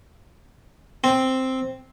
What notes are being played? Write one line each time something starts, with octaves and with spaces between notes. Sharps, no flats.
C4